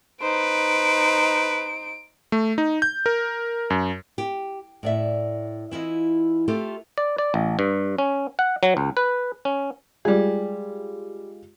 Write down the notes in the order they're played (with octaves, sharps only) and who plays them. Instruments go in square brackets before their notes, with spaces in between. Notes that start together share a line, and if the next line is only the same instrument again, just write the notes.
[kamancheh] D#4 C5 [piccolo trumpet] B4 [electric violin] D7
[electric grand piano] A3
D#4
G6
A#4
F#2
[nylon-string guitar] G4
A2 D5 E5
E3 E4 F4 D#5
A3 F4 G4 A4
[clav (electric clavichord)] D5
D5
A1
G2
C#4
F#5
F#3
C#2
B4
C#4
[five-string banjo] G3 G#4 [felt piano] G#3 F4 G4